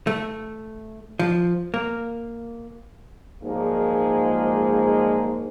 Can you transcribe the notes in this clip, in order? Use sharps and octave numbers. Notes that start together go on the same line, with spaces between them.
A3
F3
A#3
A#1 G#2 F3 F#3 G#3 A#3